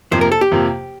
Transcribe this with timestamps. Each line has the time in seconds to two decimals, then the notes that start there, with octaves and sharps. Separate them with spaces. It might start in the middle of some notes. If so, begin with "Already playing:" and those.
0.11 F2 C3 F3 A#3 C5
0.21 A#4
0.32 A4
0.41 G4
0.52 F2 C3 F3 A#3